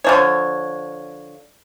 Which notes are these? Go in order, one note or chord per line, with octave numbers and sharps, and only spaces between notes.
D3 F3 C#5